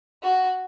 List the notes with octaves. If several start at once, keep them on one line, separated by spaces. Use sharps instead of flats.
F#4